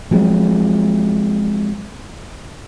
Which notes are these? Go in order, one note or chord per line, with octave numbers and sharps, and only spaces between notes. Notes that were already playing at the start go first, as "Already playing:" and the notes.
F3 F#3 G#3 C4